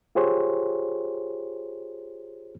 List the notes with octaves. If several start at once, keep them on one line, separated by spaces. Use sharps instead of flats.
F4 G4 G#4 C5 C#5